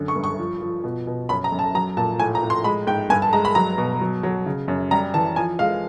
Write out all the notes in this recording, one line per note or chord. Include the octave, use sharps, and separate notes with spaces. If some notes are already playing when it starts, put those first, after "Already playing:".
Already playing: F#2 D3
C#6
G2
C#6
F3
F3
B2
B2
F#2 B5
A#5
F#2
A5
F#3 A#5
A#2 A5
A2 G#5
A#5
A2
C6
G#3 B5
G#2 G5
G2 G#5
A5
G#3 A#5
B5
F#3 A#5
B2
F#3
F#3
C#3
F#2
G3 A#5
E3 A5
F3 G#5
G#3 F5